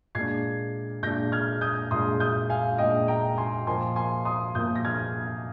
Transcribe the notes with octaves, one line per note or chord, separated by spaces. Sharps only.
A#2 G#3 D4 G#6 C7
A#2 G#3 D4 G6 A#6
F6 G#6
D#6 G6
A#2 G#3 D4 C6 D#6
D#6 G6
F5 G#5
A#2 G#3 D4 D#5 G5
G5 A#5
G#5 C6
A#2 F3 A#3 G#5 C6
G#5 C6
C6 D#6
A#2 F3 A#3 D#6 G6
A#6
F6 G#6